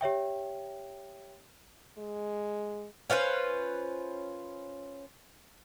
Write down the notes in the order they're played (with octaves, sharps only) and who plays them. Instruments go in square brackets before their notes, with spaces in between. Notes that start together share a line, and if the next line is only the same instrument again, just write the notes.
[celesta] G4 C#5 E5 G5
[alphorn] G#3
[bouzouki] C#4 F4 B4 C5